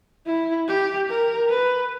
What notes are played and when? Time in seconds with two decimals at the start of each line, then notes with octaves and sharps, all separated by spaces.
0.26 E4
0.68 G4
1.09 A#4
1.49 B4